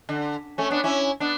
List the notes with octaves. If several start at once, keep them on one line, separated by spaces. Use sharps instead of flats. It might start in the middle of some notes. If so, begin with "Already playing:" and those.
D3
A3 C#4
B3 D4
C#4 E4
B3 D4